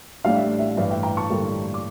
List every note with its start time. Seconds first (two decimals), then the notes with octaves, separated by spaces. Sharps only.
0.24 A1 A2 G3 D4 F5
0.36 E5
0.59 E5
0.77 A1 G2 E3 F5
0.91 E5 G5
1.03 G5 A#5
1.17 A5 C#6
1.30 A1 G2 D3 G3 A#3
1.74 D6